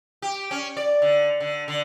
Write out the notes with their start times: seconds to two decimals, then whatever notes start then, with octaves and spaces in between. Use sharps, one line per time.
0.22 G4
0.51 C#4
0.77 D5
1.02 D3
1.40 D3
1.68 D3